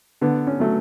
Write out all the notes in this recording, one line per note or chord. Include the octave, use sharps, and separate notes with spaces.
D3 B3
C#4
F#3 A3